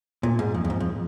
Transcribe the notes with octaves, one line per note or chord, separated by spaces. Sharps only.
A#2
G#2
F2
F2
G#2
F2